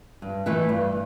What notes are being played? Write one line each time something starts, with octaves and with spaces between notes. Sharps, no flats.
G2
E3 A3 E4 B4
G2